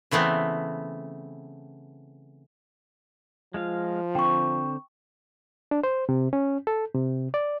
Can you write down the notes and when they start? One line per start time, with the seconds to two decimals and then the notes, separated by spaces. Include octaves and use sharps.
0.11 C#3 E3 A3 B3 C4
3.54 F3 G#3 F4 F5
4.15 D3 C4 G5 C#6
5.71 D4
5.83 C5
6.09 C3
6.33 C#4
6.67 A4
6.95 C3
7.34 D5